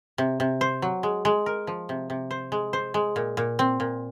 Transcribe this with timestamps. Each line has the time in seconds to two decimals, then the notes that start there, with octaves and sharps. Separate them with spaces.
0.18 C3
0.40 C3
0.61 C5
0.82 F#3
1.03 G#3
1.25 G#3
1.46 A#4
1.67 F3
1.89 C3
2.10 C3
2.31 C5
2.52 G#3
2.73 C5
2.94 G#3
3.16 A#2
3.37 A#2
3.59 C4
3.80 A#2